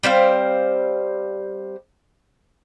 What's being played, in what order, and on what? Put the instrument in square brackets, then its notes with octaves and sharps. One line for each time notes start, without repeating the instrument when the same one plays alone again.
[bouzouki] G3 C4 C5 F5